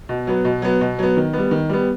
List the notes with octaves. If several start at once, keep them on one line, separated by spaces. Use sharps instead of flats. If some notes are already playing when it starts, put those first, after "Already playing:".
B2
F#3 B3
B2
F#3 B3
B2
F#3 B3
D#3
G3 B3
D#3
G3 B3